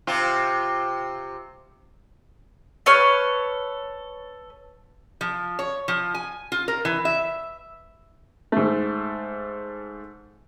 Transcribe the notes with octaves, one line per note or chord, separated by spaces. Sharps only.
C3 F4
A4 B4 C#5 F6
F3
C#5
F3
G#5
F4
A#4
E3
E5
G#2 A3